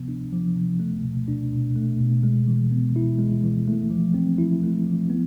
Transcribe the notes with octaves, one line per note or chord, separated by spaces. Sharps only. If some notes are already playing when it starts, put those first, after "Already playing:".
Already playing: C3 F3 B3
D4
F3
C3
A3
B2
D4
B2
A3
B2
G#3
E3
B3
E4
G#3
E3
A3
F3
C4
E4
A3
F3
B3